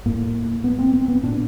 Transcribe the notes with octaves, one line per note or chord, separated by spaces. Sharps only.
A2 A#3
B3
C4
C4
B3
A#2 D4